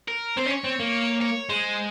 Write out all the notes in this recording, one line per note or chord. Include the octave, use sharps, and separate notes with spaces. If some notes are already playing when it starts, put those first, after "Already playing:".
A#4
C4 C5
C#4
C#5
C4
A#3
C#5
G#3 C5